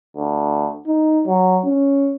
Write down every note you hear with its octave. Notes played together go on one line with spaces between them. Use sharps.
D2
D#4
F#3
C#4